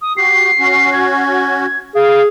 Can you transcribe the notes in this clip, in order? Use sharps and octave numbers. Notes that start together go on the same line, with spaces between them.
D#6
F#4 G4 C7
C#4 F#4
G#6
G#4 F5